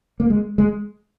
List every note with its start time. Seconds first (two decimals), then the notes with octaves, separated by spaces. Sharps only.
0.20 A#3
0.30 G#3
0.58 G#3